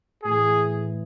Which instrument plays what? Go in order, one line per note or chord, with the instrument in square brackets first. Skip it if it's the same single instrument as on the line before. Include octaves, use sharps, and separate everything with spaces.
[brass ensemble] A2 E3 G#4